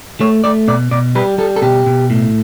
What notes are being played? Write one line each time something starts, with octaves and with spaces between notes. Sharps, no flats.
A3 C#5
A3 D5
B2 D5
B2 D5
G3 B4
G3 A4
A4
B2 G4
B2
A2